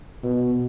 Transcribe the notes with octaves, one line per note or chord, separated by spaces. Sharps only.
B2